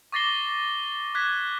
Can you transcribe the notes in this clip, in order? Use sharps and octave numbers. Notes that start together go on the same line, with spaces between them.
C#6 D6 A6 A#6 C7 G7
D6 F#6 G#6 B6